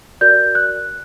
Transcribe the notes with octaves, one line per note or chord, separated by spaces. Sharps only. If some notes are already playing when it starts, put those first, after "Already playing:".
F#4 A#4 D5 G6
F#6